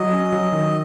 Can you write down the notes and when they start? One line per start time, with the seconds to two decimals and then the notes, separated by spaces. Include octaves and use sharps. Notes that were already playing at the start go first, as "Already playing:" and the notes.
Already playing: F#3 D#5
0.13 C#4
0.32 F#3
0.52 D#3